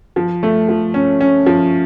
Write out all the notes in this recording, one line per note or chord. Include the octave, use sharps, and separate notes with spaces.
F3
A3
F3
C#4
C#4
F3